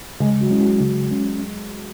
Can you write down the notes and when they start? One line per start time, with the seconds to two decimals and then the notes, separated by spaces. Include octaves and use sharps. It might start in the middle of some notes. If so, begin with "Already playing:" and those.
0.20 C#3 G#3
0.40 F#3
0.50 G#3 C#4 E4
0.61 F#3
0.80 C#3
1.11 G#3 C#4